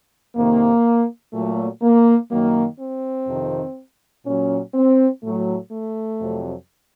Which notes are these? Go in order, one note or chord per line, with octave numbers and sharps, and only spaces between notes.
F2 C3 D#3 A#3
A#2 F#3 A3
A#3
F#2 D#3 F#3 A#3
C4
F2 C3 D#3
A#2 F#3 C#4
C4
A2 F#3 A3
A3
F2 C3 F#3